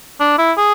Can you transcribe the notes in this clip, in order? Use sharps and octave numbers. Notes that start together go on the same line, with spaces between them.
D4
E4
G#4